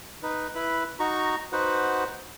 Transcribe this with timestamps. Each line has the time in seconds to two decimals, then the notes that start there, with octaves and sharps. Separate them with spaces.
0.23 D#4 B4
0.55 E4 B4 B5
1.00 D#4 F#4 A#5 C#6
1.52 D#4 F#4 B4 C5 F#5